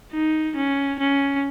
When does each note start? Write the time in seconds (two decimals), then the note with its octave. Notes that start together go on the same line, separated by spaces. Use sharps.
0.13 D#4
0.56 C#4
0.99 C#4